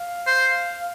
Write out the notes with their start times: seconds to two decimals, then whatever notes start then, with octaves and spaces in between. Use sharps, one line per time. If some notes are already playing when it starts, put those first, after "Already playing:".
Already playing: F5
0.27 C5